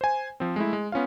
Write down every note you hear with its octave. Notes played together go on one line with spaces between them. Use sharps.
C5 G#5
F3 C4
G#3 A3 E4
G#3
B3 C#4 F4 F5